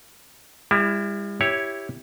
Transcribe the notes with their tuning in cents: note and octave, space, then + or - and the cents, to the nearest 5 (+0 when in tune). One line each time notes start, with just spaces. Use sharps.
G3 +40 E4 +15 G#5 +0
E4 +0 G4 +0 C#5 +0